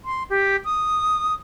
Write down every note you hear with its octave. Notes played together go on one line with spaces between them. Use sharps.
C6
G4
D#6